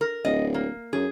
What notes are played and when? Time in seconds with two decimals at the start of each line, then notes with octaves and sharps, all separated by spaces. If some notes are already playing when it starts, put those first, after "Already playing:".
0.01 A#4
0.25 D1 D#5
0.54 A#3
0.93 F#2 G#4